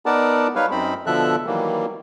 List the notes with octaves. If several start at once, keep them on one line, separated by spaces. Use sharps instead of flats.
B3 D#4 A#4 D5 F#5 A5
G3 D#4 B4 C#5 F5
F#2 C4 D#4 C5 B5
B2 D3 F3 A4 E5 F#6
D#3 E3 F#3 G3 A#3